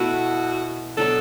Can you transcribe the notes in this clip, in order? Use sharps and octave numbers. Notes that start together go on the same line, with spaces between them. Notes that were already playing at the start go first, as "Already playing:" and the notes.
Already playing: B2 A3 E4 F#4 B4
B2 F#3 A3 D4 A4